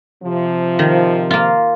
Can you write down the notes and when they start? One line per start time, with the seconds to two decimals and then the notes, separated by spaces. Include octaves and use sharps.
0.23 C3 F3
0.79 D#3
1.31 A#3 F4